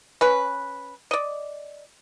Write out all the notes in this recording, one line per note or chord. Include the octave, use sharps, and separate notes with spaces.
C#4 B4
D5 D#5